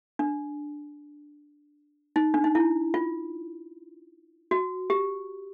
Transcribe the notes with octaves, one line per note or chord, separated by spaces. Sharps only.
D4
D#4
D4
D#4
E4
F4
F#4
G4